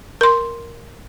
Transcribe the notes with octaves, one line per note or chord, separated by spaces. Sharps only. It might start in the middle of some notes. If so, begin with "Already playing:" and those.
A#4 C6